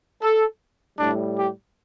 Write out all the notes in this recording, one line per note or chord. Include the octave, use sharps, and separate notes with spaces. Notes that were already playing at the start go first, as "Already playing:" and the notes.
A4
A2 G3 D4
G4